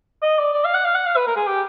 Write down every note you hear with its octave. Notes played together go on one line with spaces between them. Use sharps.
D#5
D5
D5
F5
F#5
F5
F#5
F5
B4
A#4
G#4
G4